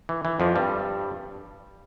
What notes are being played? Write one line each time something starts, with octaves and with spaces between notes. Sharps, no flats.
E3
E3
F2 F3
G2 G3